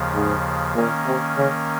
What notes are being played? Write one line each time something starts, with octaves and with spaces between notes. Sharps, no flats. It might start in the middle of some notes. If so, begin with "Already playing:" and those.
Already playing: D#2 C#3 F3
G#2
A#2 D#3 A#3 C#4
C3
C#3